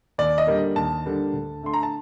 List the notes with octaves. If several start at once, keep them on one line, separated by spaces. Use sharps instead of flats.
D#2 D5
D#5
D3 G3 A#3
D#2 A5
D3 G3 A#3
D2
D3 A3 C6
A#5
A5